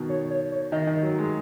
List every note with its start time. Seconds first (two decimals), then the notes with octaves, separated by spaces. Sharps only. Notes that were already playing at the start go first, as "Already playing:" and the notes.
Already playing: B2 D#3
0.09 C#5
0.30 C#5
0.52 C#5
0.72 D#3 D#5
0.87 D#3
1.03 F#3
1.18 G#3